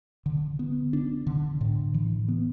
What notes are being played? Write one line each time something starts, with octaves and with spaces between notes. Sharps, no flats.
D3
B3
D4
D3
A2
E3
B3